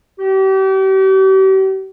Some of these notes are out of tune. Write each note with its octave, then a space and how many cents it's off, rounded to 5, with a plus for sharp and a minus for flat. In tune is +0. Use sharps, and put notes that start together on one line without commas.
G4 -40